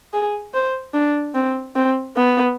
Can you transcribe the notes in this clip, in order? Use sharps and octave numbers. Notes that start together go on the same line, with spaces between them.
G#4
C5
D4
C4
C4
B3